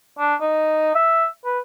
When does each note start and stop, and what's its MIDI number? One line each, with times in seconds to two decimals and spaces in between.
0.19 0.35 62
0.41 0.90 63
0.95 1.27 76
1.45 1.59 71